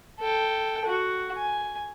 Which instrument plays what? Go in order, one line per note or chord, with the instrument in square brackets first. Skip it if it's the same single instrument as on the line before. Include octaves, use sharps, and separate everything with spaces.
[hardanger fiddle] A4 G5
F#4
G#5